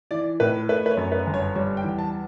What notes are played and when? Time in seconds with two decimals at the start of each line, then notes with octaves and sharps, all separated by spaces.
0.11 E3 D5
0.40 A2 B4
0.69 A3 B4
0.86 B4
0.91 C#5
0.97 F#2
1.12 B4
1.27 G1
1.34 C#5
1.55 G3 C#5
1.77 G5
1.84 E2
1.99 A5